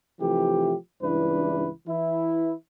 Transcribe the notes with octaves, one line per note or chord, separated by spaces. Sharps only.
C3 E3 F3 A3 G4
C#2 G2 E3 D4 E4 B4
E3 E4